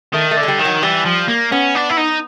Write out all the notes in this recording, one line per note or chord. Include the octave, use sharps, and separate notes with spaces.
D#3 A3
A3
D3
G#3
G3
D#3
F#3
E3 G3
F3
A#3
B3 C#4
D4
E4
D#4